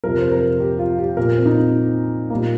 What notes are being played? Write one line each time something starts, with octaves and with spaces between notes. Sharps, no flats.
F2 C3 F3 A#4
C5
A#4
G4
F4
G4
A#2 A#3 A#4
C4
D#4
A#2 G3 A#3